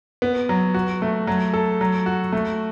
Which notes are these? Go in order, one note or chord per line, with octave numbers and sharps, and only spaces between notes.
B3
F#3
F#4
A3
F#3
A4
F#3
F#4
A3